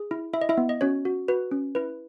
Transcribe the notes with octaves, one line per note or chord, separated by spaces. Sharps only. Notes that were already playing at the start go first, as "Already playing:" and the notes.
Already playing: G#4
E4
E4 E5
D#5
E4 E5
B3
D#5
C#4 F#4 C#5
F#4
F#4 B4
C#4
E4 B4